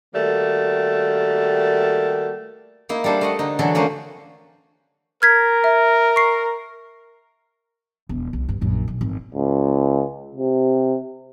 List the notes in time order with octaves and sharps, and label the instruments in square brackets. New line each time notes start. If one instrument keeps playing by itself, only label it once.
[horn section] D#3 G3 A3 A#3 F#4
[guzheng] A#3 D#4 E4
G3 D4 A4 C5
A3 D#5 F#5
D3 D#4
D3 E3 F#3 A4
F3 A3 A#3 C#4 B4 C5
[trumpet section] A#4 [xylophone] F6 G#6 B6
[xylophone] E5
C#6 C7
[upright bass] E1
C2
G2 C#3
A#1 F#2
B1
G#1 D#3
[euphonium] C#2
C3